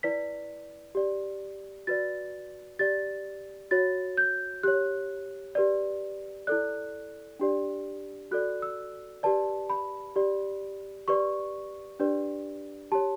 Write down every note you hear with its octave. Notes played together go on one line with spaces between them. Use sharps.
E4 B4 D5 B6
G4 D5
F#4 B4 D5 A6
G4 D5 A6
F#4 C#5 A6
G6
G4 C#5 F#6
G4 B4 D5
E4 A4 D5 F#6
D4 G4 D5
F#4 A4 D5 F#6
E6
G4 B4 D5 A5
B5
G4 D5
G4 B4 D5 C#6
D4 G4 B4 D5
G4 C#5 A5